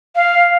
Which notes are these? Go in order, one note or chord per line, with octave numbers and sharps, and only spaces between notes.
F5